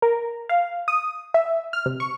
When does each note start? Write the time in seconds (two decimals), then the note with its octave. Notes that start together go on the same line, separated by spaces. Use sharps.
0.02 A#4
0.49 F5
0.88 D#6
1.34 E5
1.73 F6
1.86 C3
2.00 C#6